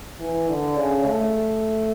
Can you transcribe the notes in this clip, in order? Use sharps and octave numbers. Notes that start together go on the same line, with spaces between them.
E3
D3
C#3
A3